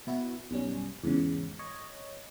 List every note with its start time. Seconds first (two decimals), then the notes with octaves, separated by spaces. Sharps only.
0.07 B2 E4 F#4
0.51 B1 F#2 G3 C#4
1.04 E2 G#2 C#3
1.59 C#5 D#5